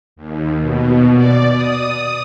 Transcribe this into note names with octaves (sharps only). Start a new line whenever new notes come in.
D#2
B2
D5
D#6